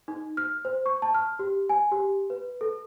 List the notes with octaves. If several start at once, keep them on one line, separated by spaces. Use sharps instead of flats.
D#4
F6
C5
C#6
A5
F6
G4
G#5
G4
B4
A4